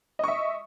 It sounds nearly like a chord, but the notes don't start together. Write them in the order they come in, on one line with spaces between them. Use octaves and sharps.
D#5 C#6 E5